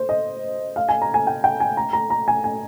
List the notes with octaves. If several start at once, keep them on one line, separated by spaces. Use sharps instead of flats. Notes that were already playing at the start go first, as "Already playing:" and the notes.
Already playing: C5
D#5
F5
G#5
A#5
G#5
G5
G5
G#5
A#5
A#5
A#5
G#5
G#5